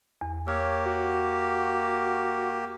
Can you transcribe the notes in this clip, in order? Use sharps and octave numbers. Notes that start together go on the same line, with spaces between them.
E2
A#3 G4 C#5 E6 F6
F#4